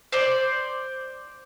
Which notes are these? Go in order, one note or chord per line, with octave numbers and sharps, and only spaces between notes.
C5 D5